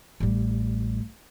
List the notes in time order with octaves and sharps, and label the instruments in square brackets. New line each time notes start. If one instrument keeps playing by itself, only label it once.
[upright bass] A1 G3